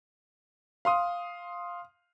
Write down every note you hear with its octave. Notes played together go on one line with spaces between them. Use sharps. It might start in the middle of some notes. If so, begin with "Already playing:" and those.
F5 C6 D#6